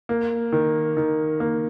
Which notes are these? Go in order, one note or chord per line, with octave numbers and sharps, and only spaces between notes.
A#3
D#3
D#3
A#3